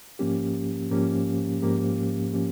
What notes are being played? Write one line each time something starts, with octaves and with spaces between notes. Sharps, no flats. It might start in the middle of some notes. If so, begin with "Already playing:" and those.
G#2 F3 A#3 C#4 G4
G#2 F3 A#3 C#4 G4
G#2 F3 A#3 C#4 G4
F3 A#3 C#4 G4